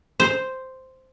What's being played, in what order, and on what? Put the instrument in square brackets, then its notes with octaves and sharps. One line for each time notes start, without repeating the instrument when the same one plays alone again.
[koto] C5